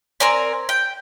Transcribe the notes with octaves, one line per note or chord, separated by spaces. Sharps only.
C4 A#4 D5 G#5
G5